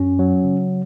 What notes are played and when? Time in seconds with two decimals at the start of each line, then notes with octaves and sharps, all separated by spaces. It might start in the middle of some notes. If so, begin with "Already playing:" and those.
Already playing: F#2 C#4
0.19 F#3
0.44 C#3